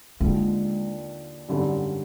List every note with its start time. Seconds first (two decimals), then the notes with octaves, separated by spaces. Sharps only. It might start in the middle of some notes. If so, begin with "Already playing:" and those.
0.20 D#2 D3 F3 G#3
1.49 G#1 F#2 D3 G3